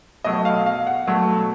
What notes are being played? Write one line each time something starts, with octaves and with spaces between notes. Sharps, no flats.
B2 F#3 A3 D#5
F5
F5
F#5
B2 F#3 A3